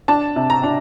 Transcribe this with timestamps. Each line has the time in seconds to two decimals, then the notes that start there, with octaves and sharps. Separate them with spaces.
0.08 D4 A5
0.36 C3
0.50 A#5
0.63 D4